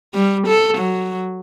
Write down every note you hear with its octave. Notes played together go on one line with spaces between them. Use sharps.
G3
A4
F#3